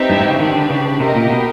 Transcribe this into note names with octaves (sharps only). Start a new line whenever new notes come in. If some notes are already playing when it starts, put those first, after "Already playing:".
Already playing: C4 D#4 G4 B4 E5
G2
G#2
C#3
D#3 D4 G4 B4
D3
C#3
C3 G4 A#4 D#5
A#2
B2